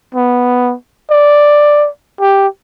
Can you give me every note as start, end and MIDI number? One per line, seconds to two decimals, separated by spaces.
0.15 0.74 59
1.11 1.88 74
2.21 2.47 67